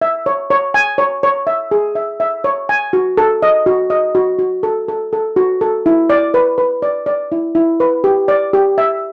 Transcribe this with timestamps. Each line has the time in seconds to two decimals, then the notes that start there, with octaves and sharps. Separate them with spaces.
0.02 E5
0.26 C#5
0.50 C#5
0.74 G#5
0.98 C#5
1.23 C#5
1.47 E5
1.71 G#4
1.95 E5
2.20 E5
2.44 C#5
2.69 G#5
2.93 F#4
3.17 A4
3.43 D#5
3.66 F#4
3.90 D#5
4.15 F#4
4.39 F#4
4.63 A4
4.88 A4
5.13 A4
5.36 F#4
5.61 A4
5.86 E4
6.10 D5
6.34 B4
6.58 B4
6.82 D5
7.06 D5
7.32 E4
7.55 E4
7.80 B4
8.04 G4
8.28 D5
8.53 G4
8.78 E5